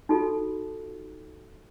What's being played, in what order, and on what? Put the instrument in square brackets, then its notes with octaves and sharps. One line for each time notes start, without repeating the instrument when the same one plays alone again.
[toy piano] D#4 F4 F#4 A4